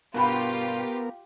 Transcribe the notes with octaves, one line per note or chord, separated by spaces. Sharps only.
G2 B2 B3 F4 G4 A#4